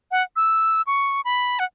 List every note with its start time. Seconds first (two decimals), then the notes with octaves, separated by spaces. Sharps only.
0.11 F#5
0.36 E6
0.87 C#6
1.25 B5
1.59 F#5